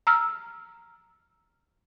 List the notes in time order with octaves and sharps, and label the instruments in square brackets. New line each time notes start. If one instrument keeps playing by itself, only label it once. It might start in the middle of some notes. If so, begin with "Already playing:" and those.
[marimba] A#5 E6 F6